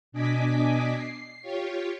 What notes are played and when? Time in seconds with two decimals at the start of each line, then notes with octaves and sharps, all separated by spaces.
0.12 B2 D4 D#5 G#5 D6 B6
0.94 C7
1.42 F4 G4 C#5